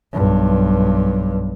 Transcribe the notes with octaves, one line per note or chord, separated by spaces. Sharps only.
B1 G2